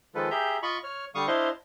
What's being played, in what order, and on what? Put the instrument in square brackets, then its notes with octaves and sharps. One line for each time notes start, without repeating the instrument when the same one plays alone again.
[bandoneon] D#3 F3 G#3 F4 A4 B4
G4 G#4 E5 A#5 G6
F4 D#5 B5 C#6
C#5 F6
D3 G3 F5 C#6 D#6
D4 E4 C5 D#5 F5 C6